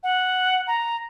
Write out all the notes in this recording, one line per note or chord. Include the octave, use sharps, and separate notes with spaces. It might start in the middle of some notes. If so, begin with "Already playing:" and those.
F#5
A#5